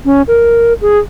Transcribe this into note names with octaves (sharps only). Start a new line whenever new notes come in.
C#4
A#4
G#4